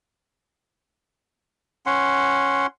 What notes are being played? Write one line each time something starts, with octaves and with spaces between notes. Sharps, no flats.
C#4 F#5 C6